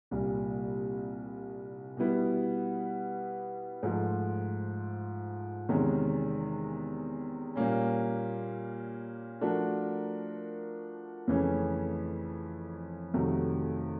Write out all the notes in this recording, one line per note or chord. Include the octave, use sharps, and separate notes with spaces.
C2 A#2 G3
B2 G3 B3 E4
G#2 F3 A3
E2 C3 D#3 G#3 C#4
A#2 G3 A#3 C#4
F3 A3 D4 F#4 A#4
F2 C#3 E3 A3 C#4
F2 C3 D#3 F#3 A3